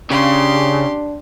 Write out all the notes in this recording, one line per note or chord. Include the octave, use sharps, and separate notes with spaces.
C#3 D4 G4 C6